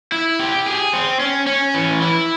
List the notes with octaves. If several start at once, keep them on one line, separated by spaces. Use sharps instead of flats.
E4
G4
G#4
C4
C#4
C#4
E3
E4